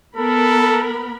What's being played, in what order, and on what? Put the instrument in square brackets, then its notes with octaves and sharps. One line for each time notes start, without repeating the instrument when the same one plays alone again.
[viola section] B3 A#4 B5 [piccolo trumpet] A4